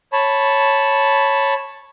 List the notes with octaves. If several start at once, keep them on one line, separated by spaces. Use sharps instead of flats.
C#5 A5 B5